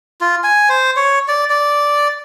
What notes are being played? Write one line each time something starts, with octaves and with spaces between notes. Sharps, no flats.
F4
G#5
C5
C#5
D5
D5